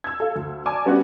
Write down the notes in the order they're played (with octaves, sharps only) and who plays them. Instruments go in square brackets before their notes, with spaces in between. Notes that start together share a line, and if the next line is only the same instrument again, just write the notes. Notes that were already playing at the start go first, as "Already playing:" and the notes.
[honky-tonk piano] E6 G#6
A4 F5
D2
D5 G#5 A5 D6
G3 B3 C#4 D4 F#4 G4